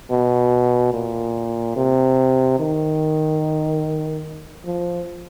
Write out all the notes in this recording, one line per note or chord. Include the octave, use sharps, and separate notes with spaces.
B2
A#2
C3
D#3
F3